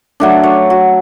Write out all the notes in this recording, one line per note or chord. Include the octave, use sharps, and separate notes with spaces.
F#3 A3 D4
C#5
F#4